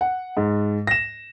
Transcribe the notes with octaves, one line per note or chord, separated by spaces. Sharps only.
F#5
G#2
A#6 E7